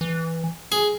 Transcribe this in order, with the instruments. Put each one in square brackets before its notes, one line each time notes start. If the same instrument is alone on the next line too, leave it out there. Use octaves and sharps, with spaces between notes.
[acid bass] E3
[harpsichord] G#4